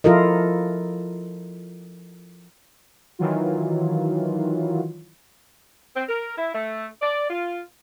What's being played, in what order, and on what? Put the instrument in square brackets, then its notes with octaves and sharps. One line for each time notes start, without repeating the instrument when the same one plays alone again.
[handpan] F3 E4 F4 A4 A#4 D#5
[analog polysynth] D#3 E3 F#3 F4
[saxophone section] C4
A#4
E4
A3
D5
F4